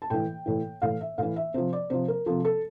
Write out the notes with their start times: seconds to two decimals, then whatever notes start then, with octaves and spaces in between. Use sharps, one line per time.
0.02 A5
0.10 A2 E3 G5
0.46 A2 E3
0.82 A2 E3 F5
1.01 E5
1.18 A2 E3 F5
1.36 E5
1.54 C3 F3 C5
1.73 D5
1.90 C3 F3 C5
2.08 A#4
2.26 C3 F3 A4
2.45 A4